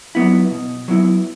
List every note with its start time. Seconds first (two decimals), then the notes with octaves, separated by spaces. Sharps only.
0.15 F#3 B3 E4
0.51 B2
0.88 F#3 B3 E4